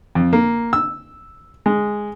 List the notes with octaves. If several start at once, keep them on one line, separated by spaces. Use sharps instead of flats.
F2
A#3
E6
G#3